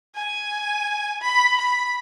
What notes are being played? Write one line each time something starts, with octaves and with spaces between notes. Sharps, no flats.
G#5
B5
B5